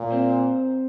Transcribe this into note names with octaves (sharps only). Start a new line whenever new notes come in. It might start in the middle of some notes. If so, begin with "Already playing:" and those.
Already playing: A#2
C4